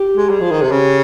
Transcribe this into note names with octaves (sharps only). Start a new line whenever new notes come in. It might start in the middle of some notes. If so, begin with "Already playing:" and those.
Already playing: G4
G#3
G3 G#4
F3
D#3
C3
C#3 G4